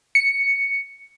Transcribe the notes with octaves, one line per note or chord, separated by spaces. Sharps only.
C#7